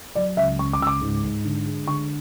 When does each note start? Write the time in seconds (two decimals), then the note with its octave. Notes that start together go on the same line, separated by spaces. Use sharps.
0.15 F#3 D5
0.37 C#2 E5
0.59 C#2 C#6
0.73 D6
0.80 C#2 E6
0.87 D6
1.01 G#2
1.24 G#2
1.45 D3
1.66 G#3
1.87 D3 C#6